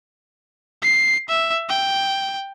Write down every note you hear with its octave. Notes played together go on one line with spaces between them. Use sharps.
C7
E5
G5